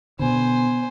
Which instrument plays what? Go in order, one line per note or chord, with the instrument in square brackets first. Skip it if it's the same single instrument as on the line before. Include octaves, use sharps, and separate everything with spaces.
[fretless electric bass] B2 D3 [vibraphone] B3 [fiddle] C5 G#5